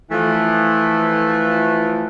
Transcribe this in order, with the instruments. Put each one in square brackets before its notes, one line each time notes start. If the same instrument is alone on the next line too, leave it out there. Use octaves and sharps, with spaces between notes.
[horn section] E3 F3 A3